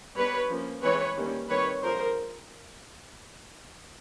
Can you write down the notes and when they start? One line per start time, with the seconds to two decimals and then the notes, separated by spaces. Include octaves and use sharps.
0.16 G3 B3 D4 B4 C#5
0.50 F3 A#3 C#4
0.83 E3 G#3 C4 B4 C#5
1.16 D#3 G3 A#3 C#4
1.49 D#3 G3 C4 B4 C#5
1.82 D3 F3 G#3 A#4 C5